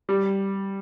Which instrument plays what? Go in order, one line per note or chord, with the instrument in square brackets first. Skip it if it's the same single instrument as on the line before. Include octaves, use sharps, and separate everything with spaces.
[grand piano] G3